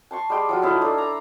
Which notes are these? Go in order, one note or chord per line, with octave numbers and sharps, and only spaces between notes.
A5 C6 C#6
G3 G#3 G5 C6
F3 F#3 F4
C#4 D#4 E4 A4
D4 A4 C5
A#5